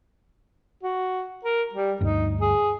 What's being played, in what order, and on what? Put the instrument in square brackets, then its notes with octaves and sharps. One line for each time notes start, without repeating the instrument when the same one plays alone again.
[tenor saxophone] F#4
A#4
G3
[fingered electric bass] G1 D2 G2 [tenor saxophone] D#4
[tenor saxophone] G#4